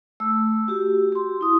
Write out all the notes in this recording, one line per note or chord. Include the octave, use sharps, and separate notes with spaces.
A3 E6
F#4 G4
G4 C6
E4 D#6